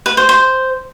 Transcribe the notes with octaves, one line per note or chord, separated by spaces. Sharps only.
B4
C5
C5